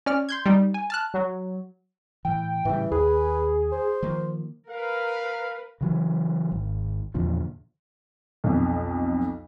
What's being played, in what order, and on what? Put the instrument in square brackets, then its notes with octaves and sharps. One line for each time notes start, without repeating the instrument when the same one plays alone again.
[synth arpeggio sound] C#4 D5 F6
C6 G6 G#6
G3 D#4
G#5
A5 F6 F#6
[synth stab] F#3
[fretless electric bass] A2 E3 [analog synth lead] G5
[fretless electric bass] A2 C#3 G3 [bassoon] E3
[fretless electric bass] D#2 [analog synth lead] G#4 [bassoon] B4
[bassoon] C5
[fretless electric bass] D#3 F3 A#3
[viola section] A#4 B4 [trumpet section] F5
[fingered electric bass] C#3 E3 F#3
G#1
E2 A#2 D3 F3
[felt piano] B1 F2